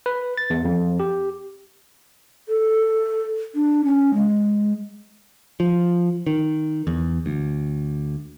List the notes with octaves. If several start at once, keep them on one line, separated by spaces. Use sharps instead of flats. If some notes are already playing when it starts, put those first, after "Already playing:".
B4
A6
E2
F2
G4
A4
D4
C#4
G#3
F3
D#3
E2
D2